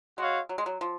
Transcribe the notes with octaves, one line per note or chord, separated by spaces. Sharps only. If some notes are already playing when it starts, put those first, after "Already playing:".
G#3 F#4 C#5 F5
F#3
G#3
F#3
F3